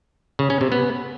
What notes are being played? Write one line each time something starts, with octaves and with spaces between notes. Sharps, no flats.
C#3
C#4
C3
B3